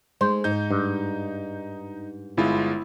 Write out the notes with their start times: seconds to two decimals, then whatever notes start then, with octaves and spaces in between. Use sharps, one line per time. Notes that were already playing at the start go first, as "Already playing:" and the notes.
0.21 G#3 A3 D#4 C5
0.44 G#2 D#4 G6
0.71 G2
2.37 G1 G#3 E4 F4